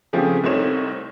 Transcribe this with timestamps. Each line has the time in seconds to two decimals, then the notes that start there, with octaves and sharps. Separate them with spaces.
0.13 C#3 F3 A3 C4 G4 G#4
0.44 C2 A3 C4 D#4 C#5 E7